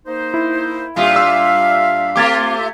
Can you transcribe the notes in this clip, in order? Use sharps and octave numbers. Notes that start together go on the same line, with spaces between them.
A#3 D#4 C5
E4
A#2 G3 D4 F4 E5 F5
E6
A3 C4 F4 G4 D6 G#6 A6
F4 E5